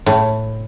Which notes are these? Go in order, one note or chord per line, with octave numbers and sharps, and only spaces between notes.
A2